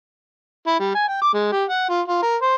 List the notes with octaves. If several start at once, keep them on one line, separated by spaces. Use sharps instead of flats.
E4
G3
G#5
G5
D6
G#3
G4
F#5
F4
F4
A#4
C5